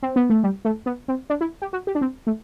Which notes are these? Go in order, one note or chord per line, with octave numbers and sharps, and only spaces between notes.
C4
B3
A3
G3
A3
B3
C4
D4
E4
G4
F#4
G4
D4
C4
A3